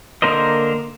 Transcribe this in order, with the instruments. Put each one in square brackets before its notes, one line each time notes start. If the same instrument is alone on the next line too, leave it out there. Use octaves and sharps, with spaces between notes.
[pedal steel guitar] D3 A#3 A#4 C5 D#5